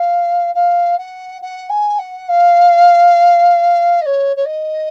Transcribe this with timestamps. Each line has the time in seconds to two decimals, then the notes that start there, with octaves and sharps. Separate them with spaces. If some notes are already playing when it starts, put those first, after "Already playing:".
Already playing: F5
0.55 F5
0.98 F#5
1.42 F#5
1.70 G#5
1.99 F#5
2.29 F5
4.02 D#5
4.06 C#5
4.36 C#5
4.45 D#5